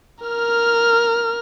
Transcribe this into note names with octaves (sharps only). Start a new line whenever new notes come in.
A#4 F6